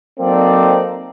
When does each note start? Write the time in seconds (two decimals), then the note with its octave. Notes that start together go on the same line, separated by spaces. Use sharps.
0.20 F#3 A#3 C4 D#4 A4 D5